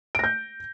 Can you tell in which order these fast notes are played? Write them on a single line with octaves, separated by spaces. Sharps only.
D7 A#6 G6